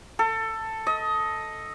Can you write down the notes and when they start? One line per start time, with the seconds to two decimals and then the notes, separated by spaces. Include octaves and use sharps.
0.19 A4
0.87 D#5